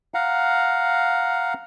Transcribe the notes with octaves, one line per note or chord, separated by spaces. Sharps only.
F5 F#5 A#5